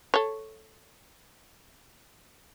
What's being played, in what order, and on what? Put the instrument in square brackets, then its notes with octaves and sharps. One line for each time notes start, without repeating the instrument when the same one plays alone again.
[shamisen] A4 C#5